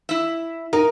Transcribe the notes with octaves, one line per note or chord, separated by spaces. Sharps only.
E4 E5
D#4 A#4